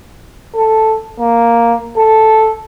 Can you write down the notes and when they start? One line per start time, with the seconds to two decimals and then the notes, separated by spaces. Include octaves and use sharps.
0.55 A4
1.19 A#3
1.97 A4